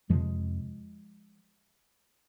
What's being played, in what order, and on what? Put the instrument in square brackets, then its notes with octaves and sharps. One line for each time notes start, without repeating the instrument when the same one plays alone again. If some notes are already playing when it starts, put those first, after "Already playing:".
[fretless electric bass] F2 C3 F3 G#3